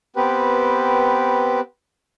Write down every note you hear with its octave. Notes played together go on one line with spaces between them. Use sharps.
B3 C4 G4 B4